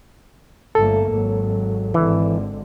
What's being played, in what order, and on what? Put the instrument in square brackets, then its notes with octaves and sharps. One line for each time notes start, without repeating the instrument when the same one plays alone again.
[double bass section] G1 A3 A#3 [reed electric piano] A4
[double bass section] G#1 F#3
[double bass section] G#1 D3 [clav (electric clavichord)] E3